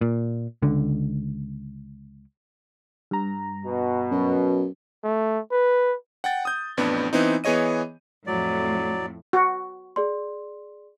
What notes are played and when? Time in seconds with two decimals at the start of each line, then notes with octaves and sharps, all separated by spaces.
0.01 A#2
0.62 C#2 D3
3.11 G2 A#5
3.65 B2
4.11 F#2
5.03 A3
5.51 B4
6.24 F#5 G5 A6
6.45 D#6 G6
6.77 A1 F2 B3 D4
7.13 E3 B3 C4 D#4
7.44 E3 B3 G#4 C#5 D#5 D#7
8.27 F2 A2 F#3 D5
9.33 F#4
9.96 G#4 D5 C6